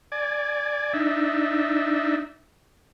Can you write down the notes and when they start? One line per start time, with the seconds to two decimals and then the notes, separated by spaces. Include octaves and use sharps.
0.12 D5 G#5
0.93 D4 D#4 E5